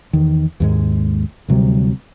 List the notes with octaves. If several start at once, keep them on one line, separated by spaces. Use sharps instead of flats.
E2 D#3
D#2 G#2 G#3
D2 C3 F#3 G3